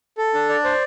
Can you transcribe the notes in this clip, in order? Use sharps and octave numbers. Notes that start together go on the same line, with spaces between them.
A4
D4
D5
C5